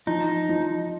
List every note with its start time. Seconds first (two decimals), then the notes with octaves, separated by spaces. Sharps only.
0.07 F3 D#4
0.49 F3